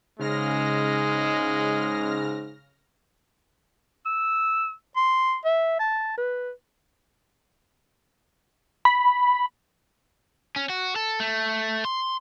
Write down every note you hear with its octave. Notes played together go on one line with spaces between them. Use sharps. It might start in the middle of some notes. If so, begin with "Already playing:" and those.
G#2 C#3 G#3 F6 A#6
E6
C6
E5
A5
B4
B5
C#4
F#4
A4
A3
C6